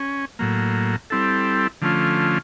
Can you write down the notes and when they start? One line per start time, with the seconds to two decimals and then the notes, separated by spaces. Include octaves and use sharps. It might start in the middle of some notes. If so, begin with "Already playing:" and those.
Already playing: C#4
0.39 A2 F#3 A#3
1.10 G3 C4 E4 A4
1.82 D3 F3 A3 C#4 F4